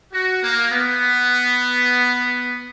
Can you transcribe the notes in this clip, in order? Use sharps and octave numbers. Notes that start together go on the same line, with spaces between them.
F#4
A#3
B3